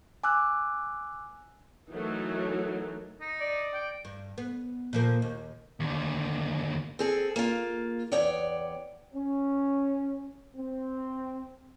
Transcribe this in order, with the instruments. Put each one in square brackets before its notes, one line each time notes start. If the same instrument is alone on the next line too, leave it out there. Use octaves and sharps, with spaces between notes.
[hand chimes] G#5 D6 E6 F#6
[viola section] E3 F#3 A3 D#4 A#4
[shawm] D#4
[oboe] D5
[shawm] G5
[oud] G2
B3
A#2 F3 A#4
D#2
[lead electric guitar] D#2 D3
[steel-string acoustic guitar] C4 G#4 A4
A#3 F4
E2 C#5 D5 F#5 G5
[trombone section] C#4
C4